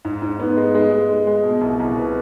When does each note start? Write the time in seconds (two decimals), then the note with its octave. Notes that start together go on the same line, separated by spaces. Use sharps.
0.05 G#2
0.22 G#2
0.39 B3
0.57 G#3
0.75 G#3
0.92 G#3
1.09 G#3
1.27 G#3
1.44 B2
1.61 C2
1.80 C2
1.97 B3